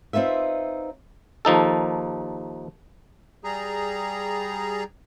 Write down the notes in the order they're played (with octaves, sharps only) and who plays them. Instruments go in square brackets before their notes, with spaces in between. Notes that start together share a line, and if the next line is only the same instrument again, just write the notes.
[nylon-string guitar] C4 D#4 F4 B4 E5
[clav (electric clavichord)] D#2 F3 D#4 A4
[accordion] G3 G#4 A#5